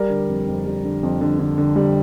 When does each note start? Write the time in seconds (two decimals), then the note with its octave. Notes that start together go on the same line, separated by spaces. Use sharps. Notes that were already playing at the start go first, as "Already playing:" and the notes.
Already playing: G3 A#4 D5
0.10 D3
0.29 F2
0.47 F2
0.66 G3
0.84 D3
1.03 F2
1.21 D3
1.39 D3
1.58 D3
1.76 G3